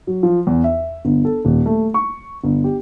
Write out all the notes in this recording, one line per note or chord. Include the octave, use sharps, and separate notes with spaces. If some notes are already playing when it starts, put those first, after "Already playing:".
F#3
F3
E2
E5
G1
A4
D#1
A3
C#6
G1
G4